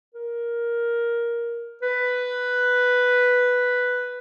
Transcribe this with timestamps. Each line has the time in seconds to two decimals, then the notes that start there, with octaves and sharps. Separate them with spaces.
0.15 A#4
1.82 B4